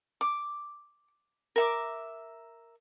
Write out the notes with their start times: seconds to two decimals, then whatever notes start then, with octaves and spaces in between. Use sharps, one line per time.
0.21 D6
1.56 A#4 E5 D6